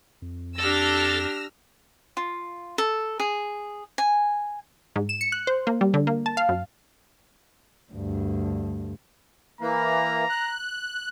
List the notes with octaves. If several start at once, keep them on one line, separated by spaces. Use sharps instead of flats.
F2
D4 G4 A4 E6 F6 A#6
F4
A4
G#4
G#5
G#2
E7
C#7
F#6
C5
A#3
G3
D3
A#3
A5
F5
F#2
D2 G2
E3 A#3 A#5
F#6